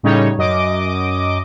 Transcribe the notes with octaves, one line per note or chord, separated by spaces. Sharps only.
A2 C#3 G3 D#4 C#5
F#2 D#5 D6 D7